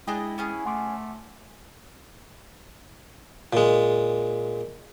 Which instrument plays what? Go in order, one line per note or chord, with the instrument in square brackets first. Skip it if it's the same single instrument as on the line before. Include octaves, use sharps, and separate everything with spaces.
[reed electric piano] G#3 G5 [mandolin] D4 G#4 D#5 [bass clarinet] E4
[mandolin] B3 C#4 G#4
[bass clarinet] A3 [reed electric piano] F#5 C6 D6
[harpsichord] A#2 G#3